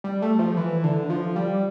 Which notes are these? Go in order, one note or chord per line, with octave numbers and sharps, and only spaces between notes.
G3
A3
F3
E3
D3
F3
G3